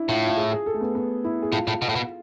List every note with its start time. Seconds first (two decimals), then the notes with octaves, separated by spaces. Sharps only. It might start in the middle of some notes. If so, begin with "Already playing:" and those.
Already playing: D4 E4
0.09 A2 F4
0.27 F4
0.37 G#4
0.52 G#4
0.66 A4
0.74 A3
0.81 B3
0.95 B3
1.24 E4
1.43 G#4
1.52 A2 F4
1.67 A2
1.82 B2
1.89 A2
1.96 B2